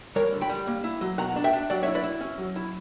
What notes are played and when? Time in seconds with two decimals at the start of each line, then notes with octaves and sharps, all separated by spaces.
0.16 G3 A#4 C#5
0.32 D3
0.41 G5 B5
0.50 G3
0.67 A#3
0.84 E4
1.01 F#3
1.18 B2 F#5 A#5
1.36 D4
1.44 E5 G5
1.53 D4
1.70 F#3 D5 F#5
1.82 C#5 E5
1.87 E4
1.95 B4 D5
2.04 E4
2.21 C#4
2.38 F#3
2.56 E4